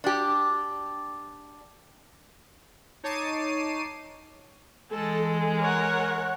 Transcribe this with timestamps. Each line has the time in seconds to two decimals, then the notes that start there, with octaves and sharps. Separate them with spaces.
0.04 D4 G4
3.04 D#4 C#5 A5 D6 C7 D#7
4.91 E3 G#3 A4
5.60 A#4 C#5 F#5